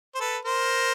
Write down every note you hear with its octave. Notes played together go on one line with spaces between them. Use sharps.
C5
A4 B4
A#4 C5